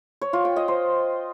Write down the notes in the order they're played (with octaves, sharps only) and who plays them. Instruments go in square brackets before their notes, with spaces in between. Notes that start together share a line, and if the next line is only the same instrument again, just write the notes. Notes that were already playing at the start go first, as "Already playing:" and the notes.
[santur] C#5
F4
G5
D#5
C5